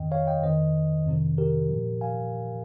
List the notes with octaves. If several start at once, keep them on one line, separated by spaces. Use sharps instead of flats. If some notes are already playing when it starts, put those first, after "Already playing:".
Already playing: F2 D#3 D#5 G5
C#5 F5
D#5 G5
F2 D#3 C5 D#5
F2 C3 D#3
G4 A#4
A#2 F3
F5 G#5